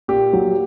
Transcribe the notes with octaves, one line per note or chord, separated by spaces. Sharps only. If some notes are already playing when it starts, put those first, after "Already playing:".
A#2 G4
F#3